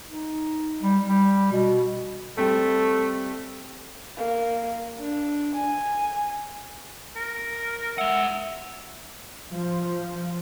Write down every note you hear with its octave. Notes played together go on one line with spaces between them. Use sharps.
D#4
G3
G3
B2
G3 A3 C4
A#3
D4
G#5
A#4
G#3 E5 F#5
F3